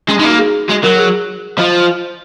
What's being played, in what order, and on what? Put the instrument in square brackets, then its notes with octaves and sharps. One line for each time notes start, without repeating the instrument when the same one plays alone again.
[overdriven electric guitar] G#3 [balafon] C#4
[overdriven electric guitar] G#3 [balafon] D#4
[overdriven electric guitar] A#3
[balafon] F#4
G#4
[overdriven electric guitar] G#3 [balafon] F#4
[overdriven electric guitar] F#3 [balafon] A#4
[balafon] G#4
[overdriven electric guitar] F3 [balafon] D#5